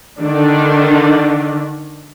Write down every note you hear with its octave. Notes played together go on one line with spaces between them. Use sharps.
D3 D#3 D4